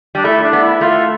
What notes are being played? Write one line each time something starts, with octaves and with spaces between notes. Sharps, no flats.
G3 D4
A3 E4
D4
B3
E4
A3 F4